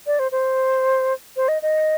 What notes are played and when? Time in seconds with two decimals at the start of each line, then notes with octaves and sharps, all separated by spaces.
0.07 D5
0.19 C5
0.32 C5
1.36 C5
1.48 D#5
1.62 D#5